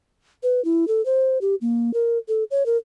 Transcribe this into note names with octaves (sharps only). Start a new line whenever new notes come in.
B4
E4
A4
C5
G4
A#3
A#4
A4
C#5
A#4